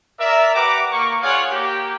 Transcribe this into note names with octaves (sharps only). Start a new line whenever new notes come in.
A#4 D5 E5
G4 B4 F#5 A#5 D6
A#3 C#6
F4 G#4 C#5 D5 F5 F#5
A#3 G4